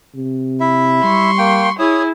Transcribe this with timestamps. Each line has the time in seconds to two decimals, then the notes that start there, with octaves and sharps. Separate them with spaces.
0.15 C3
0.60 E4 E5
1.04 G3 C6 C#6
1.38 A#3 G5
1.79 E4 G#4 C#5 D#6